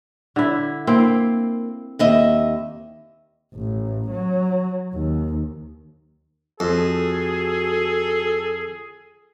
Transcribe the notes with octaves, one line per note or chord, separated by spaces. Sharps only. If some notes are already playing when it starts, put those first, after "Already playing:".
D3 E4
A#3 C4 E4
D#2 D#5 E5
A1
F#3
D#2
F2 F#4 G#4 A4